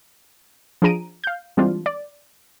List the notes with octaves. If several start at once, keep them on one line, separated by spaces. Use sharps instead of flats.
F3 D4 G#4 A#5 D7 D#7
F5 G6
E3 G3 G#3 C4 D4 F4
D5